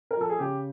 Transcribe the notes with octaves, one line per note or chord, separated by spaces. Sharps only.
A#4
F3 A4
G#4
C#3 G4